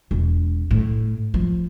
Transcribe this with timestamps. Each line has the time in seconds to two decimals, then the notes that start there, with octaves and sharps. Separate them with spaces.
0.11 E1
0.71 A2
1.34 F3